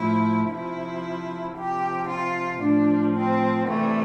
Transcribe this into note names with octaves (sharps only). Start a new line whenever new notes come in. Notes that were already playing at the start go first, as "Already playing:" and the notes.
Already playing: A2 F3 E4
C3 F3 E4
C3 F3 G4
F4
A2 F3 D4
C4
C3 E3 G3 A3